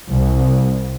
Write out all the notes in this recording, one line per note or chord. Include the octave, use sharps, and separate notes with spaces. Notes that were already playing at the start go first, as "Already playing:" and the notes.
C2